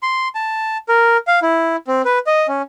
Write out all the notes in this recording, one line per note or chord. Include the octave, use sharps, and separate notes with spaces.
C6
A5
A#4
F5
E4
C4
B4
D#5
C#4